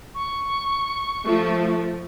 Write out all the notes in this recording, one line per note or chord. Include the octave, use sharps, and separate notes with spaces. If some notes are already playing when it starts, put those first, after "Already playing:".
C#6
F3 A3